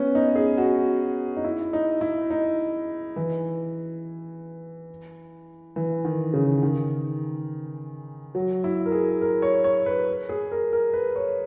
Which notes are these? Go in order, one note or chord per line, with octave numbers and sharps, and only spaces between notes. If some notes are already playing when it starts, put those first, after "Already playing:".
Already playing: B3 C#4
D#4
G#4
F#4
D#4
E4
D#4
E4
D#4
E3
E3
D#3
C#3
D#3
F#3
E4
A#4
G#4
A#4
C#5
C#5
B4
G#4
A#4
A#4
B4
C#5